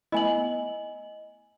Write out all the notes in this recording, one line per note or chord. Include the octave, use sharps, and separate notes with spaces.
A3 B3 E4 D#5 G#5 F#7